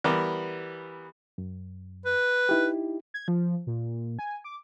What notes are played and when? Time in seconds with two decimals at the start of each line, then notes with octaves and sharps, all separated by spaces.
0.04 E3 G3 B3 A#4 D6
1.38 F#2
2.06 B4
2.49 D#4 E4 G4
3.14 G#6
3.28 F3
3.67 A#2
4.19 G#5
4.44 D6